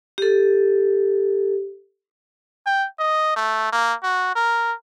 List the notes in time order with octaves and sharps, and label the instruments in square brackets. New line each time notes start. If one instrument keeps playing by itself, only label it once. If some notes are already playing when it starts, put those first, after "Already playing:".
[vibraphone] G4 A4
[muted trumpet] G5
D#5
A3
A#3
F#4
A#4